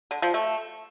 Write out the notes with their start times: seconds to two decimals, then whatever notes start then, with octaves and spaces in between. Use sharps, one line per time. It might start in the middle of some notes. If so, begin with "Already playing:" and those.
0.11 D3
0.22 F3
0.34 A3